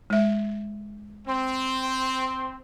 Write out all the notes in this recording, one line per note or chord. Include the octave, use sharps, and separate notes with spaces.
G#3 E5
C4 C6